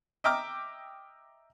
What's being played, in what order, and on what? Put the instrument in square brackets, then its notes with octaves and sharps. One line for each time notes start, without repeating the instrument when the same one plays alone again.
[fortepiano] D#5 E5 G5 A#5 D6 F6